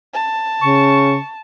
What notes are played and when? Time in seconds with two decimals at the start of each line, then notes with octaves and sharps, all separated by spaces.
0.14 A5
0.62 C#3 C#6